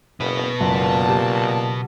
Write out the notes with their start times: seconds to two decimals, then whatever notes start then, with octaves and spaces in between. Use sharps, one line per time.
0.20 F#1 B2 B4
0.60 F#1 A#2 A5
1.08 G4